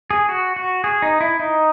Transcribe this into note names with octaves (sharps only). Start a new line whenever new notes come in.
G#4
F#4
F#4
G#4
D#4
E4
D#4